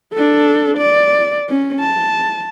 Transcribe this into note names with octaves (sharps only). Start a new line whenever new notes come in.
D4 A4
D5
C#4
A5